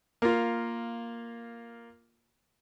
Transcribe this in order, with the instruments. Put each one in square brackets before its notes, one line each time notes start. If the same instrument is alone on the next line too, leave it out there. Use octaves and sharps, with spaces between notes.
[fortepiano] A#3 F4